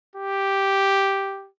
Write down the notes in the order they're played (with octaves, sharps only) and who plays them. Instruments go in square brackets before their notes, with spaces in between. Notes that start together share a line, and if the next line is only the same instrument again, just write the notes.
[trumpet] G4